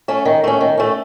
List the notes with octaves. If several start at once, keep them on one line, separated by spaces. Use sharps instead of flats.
A3 C#4
D#3
A3 C#4
D#3
A3 C#4